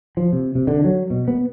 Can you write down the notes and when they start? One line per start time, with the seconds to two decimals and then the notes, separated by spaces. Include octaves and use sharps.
0.17 F3
0.33 C3
0.55 C3
0.67 D3
0.84 F#3
1.10 B2
1.28 B3